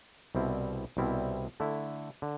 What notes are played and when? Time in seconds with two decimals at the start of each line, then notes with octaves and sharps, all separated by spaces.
0.35 C2 B2 G3 C4 E4
0.97 C2 B2 G3 C4 E4
1.60 D3 A3 E4
2.22 D3